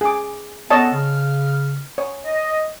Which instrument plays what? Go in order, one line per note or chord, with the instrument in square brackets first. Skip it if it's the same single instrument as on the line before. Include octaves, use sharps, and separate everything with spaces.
[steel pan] G#4 D6
[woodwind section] B3 A4 [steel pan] C#5 D#5 A5
[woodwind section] C#3 F6
[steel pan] C#5
[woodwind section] D#5